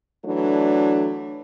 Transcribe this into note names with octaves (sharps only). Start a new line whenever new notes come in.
E3 F#3 A3 D4